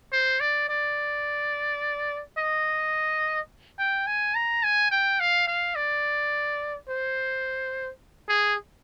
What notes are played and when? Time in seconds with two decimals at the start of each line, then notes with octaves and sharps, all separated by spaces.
0.13 C5
0.40 D5
0.69 D5
2.38 D#5
3.78 G5
4.07 G#5
4.35 A#5
4.63 G#5
4.91 G5
5.20 F5
5.48 F5
5.75 D5
6.89 C5
8.29 G#4